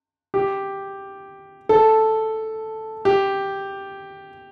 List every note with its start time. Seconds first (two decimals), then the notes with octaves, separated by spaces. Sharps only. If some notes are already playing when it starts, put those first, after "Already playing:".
0.34 G4
1.69 A4
3.05 G4